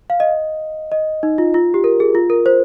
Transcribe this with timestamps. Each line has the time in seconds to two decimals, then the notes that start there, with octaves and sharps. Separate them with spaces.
0.10 F5
0.20 D#5
0.92 D#5
1.23 D#4
1.38 F4
1.54 F4
1.74 G4
1.84 A#4
2.00 G#4
2.15 F4
2.30 A#4
2.46 C5